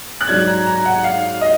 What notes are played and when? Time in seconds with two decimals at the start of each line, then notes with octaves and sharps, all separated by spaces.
0.21 F#6
0.28 G#2 F#3 D4 G#6
0.47 A#5
0.66 A#5
0.85 F#5
1.04 F5
1.41 D#5